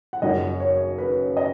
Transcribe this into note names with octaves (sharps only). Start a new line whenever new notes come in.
F#5
F#1 F#2 F#3 D#5
C#5
B4
D#5